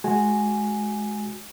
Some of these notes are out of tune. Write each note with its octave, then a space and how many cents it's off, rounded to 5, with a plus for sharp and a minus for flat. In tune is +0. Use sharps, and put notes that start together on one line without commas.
G#3 +25 F#4 +0 G#5 +0